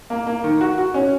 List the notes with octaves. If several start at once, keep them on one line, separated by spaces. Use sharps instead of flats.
A#3
A#3
D#3
F#4
F#4
C#4